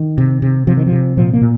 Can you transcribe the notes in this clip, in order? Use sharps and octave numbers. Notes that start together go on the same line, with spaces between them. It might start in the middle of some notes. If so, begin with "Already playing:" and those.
Already playing: D#3
C3
C3
C3 F3
D#3
F3
C3
A#2 F3
A#3
A#2